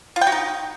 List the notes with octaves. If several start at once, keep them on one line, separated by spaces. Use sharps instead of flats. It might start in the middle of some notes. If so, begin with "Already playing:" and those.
F4
G5
F#4
D#4